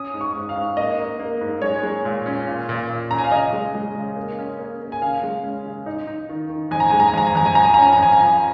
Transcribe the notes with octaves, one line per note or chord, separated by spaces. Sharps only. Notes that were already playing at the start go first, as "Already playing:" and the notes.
Already playing: C#4 D#6
G#2
C#6
G#2
F5
G#2
A#3 D#5
A#3
A#3
G#2
G#3 C#5
G#3
A#2
C#4
A#2
A#2
A#2
C#4 A#5
G#5
F5
C#3 D#5
G#3
G#3
C#3
A#3
C#4
A#3
A#3
G#5
C#3 F5
G#3
C#4
C#3
D#4
D#4
D#3
D#3
F2 G#5
A#5
G#3 G#5
A#5
G#5
F2 A#5
G#5
F2 A#5
G#5
F3 A#5
G#5
C#4 A#5
G#5
A#5
F2 G#5
A#5
F3 G#5